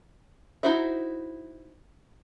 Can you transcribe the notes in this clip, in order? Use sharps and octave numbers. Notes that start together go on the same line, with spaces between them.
D#4 E4 F#4 C5 E5